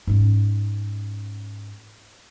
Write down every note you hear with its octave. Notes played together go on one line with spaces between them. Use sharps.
G#2 C#4